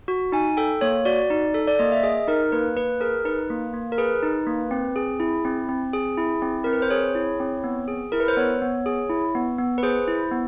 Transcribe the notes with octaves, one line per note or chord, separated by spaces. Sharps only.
F#4
D#4 G#5
A4 G5
A#3 C#5
F#4 D5
D#4
A4
D5
A#3 D#5
E5
G#4 D#5
D#4 A#4
A#3 B4
A#3 B4
G#4 A#4
D#4 B4
A#3
A#3
A#4
G#4 B4
D#4
A#3
C4
G#4
E4
C4
C4
G#4
E4
C4
C4 A#4
B4
C5
G#4 C#5
E4
C4
B3
G#4
E4 A#4
B4
C5
B3 C#5
B3
G#4
E4
B3
B3
B4
G#4 C5
E4
B3